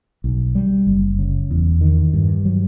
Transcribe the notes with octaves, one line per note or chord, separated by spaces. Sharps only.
B1
G3
F#1
C#3
E2
D#3
G2
F#3